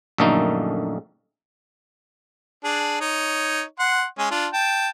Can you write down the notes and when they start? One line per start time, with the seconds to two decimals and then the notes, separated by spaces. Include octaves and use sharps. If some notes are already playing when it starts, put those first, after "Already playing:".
0.18 A#1 F#2 D3 A3 A#3 D#4
2.64 D4 G#4
3.01 D#4 C#5
3.79 F#5 C6
4.18 G#3 C#4
4.31 D4 F4
4.53 G5 A5